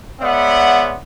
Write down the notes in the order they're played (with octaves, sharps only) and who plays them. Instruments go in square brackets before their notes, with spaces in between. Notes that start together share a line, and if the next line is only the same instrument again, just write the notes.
[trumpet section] G#3 B3 C#5 D5 E5 F#5